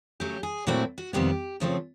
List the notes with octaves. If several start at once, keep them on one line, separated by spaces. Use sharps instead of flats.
C#3 F#3 A3 G4
G#4
A#2 F#3 A3 C4 E4 F#4
F#4
F2 C3 D#3 G3 B3 G4
F#2 C#3 F3 A3 C4